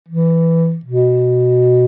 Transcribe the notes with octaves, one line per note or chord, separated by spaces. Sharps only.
E3
B2